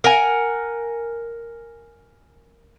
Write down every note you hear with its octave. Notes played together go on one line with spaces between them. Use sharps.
A#4 F#5 G#5